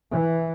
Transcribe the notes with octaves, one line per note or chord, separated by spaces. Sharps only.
E3